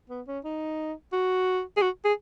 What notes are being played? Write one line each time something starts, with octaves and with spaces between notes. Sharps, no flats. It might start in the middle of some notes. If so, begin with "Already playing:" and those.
B3
C#4
D#4
F#4
G#4
F#4
G#4